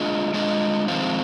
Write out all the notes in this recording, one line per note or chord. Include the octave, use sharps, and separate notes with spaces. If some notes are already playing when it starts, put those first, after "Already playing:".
Already playing: G#3 D4 F4 G#4 D#5
G#3 D4 F4 G#4 D#5
F2 D#3 G#3 C4 F4